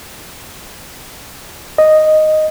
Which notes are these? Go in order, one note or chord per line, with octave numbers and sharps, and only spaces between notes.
D#5